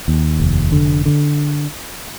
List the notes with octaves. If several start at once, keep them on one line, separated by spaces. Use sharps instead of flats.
D#2
F1
D3
D3